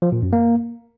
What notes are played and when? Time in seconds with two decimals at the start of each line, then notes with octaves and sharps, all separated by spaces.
0.02 F3
0.12 A#2
0.22 F#2
0.33 A#3